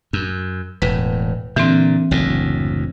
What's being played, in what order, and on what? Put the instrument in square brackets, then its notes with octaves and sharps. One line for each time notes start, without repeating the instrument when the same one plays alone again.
[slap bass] F#2
[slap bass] E1 A2 [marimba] B4
[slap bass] A#2 D3 [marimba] E3 C4
[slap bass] F#1 D2 A2